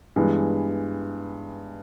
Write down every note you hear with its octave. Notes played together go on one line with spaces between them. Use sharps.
G2 E3 G#3 B3